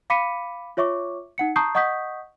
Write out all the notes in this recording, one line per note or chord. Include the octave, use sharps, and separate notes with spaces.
F5 B5 D6 B6 C#7 D#7
F4 C#5 E5 C#6 D6
D#4 F#5 C#7
A5 A#5 C#6 D#6 G6 C7
D#5 F#5 C#6 D#6 G6 B6